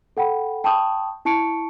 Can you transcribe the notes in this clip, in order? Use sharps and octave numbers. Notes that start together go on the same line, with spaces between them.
A4 F#5 G5 B5
G5 A5 B5 C#6 D#6 G6
E4 A5 C#6 C#7 D7